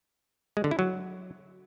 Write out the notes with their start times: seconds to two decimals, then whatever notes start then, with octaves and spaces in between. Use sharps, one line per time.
0.57 G#3
0.64 D3
0.71 E4
0.79 F#3